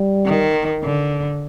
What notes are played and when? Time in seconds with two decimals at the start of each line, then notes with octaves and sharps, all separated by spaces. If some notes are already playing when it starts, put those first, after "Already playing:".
Already playing: G3
0.25 D#3
0.83 D3